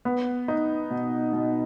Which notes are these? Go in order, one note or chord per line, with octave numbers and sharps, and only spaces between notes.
B3
D#4
B2
B2